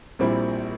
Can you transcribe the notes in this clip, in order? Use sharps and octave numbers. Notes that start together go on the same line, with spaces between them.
A#1 A#2 G3 C4 E4